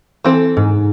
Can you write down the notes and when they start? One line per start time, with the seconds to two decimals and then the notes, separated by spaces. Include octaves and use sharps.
0.25 E3 C4 A4
0.57 G#2